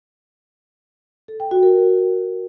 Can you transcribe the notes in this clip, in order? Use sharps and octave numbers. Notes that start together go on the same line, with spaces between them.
A4
G5
F#4
A#4